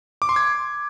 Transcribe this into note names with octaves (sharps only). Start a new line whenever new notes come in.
D6
C6
G#6